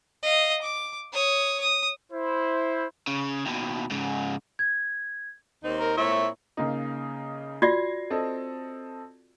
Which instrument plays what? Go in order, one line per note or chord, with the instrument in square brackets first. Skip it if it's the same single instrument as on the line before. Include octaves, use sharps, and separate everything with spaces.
[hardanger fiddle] D#5 F5
D6
C#5 D#6
D#6
[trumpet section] E4 C5
[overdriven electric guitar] C#3
D#2 B2
G#2 C#3
[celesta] G#6
[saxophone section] D#2 C4 D#4
[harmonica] A#4
[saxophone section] A#2 C4 E4 [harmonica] C#5 E5
[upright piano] C#3 A#3 D#4
[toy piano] F4 F#4 D5 [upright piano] G#6 A#6 C7
[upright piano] C4 A4 D#5